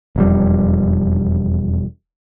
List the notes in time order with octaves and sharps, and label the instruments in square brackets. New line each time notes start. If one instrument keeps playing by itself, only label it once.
[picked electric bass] E1 F2 G3